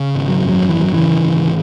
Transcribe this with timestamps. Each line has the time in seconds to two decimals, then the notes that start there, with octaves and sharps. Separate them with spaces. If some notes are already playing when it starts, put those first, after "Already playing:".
Already playing: C#3
0.15 G#1
0.28 F#3
0.41 F#2
0.49 F#3
0.69 G#1 E3
0.81 F#3
0.93 C#3 E3
1.24 G#1